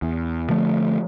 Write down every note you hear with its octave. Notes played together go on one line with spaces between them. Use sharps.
E2
D3 F3 A3